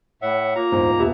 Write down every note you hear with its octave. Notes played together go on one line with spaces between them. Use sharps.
A2 C#5 E5 F#5
A#3 F4 A#5
D#1 E2 G#2 C5
D#1 B3 G4 E5